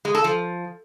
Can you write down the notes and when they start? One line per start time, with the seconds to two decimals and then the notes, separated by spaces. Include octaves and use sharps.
0.05 G#3
0.15 A4
0.24 F3